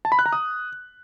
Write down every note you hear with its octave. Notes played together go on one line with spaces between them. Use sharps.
A5
B5
F#6
A#5
D#6